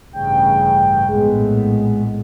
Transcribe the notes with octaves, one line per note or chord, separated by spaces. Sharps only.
A1 G2 C#3 G5
A#1 A2 G#3 B3